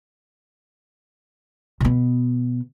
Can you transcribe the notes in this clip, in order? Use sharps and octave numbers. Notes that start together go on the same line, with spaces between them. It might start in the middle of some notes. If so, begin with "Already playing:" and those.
B2 B3